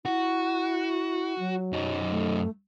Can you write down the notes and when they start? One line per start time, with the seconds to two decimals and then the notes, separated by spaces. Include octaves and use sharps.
0.05 E4 F#4
1.39 F#3
1.73 F#2 D#4
2.10 A3